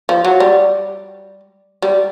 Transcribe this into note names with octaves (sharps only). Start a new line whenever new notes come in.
F3
F#3
G3
G3